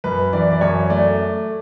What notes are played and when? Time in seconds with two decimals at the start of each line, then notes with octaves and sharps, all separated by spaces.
0.04 F#2 B4
0.33 E3 D5
0.50 D5
0.61 F#2 C#5
0.90 A3 D5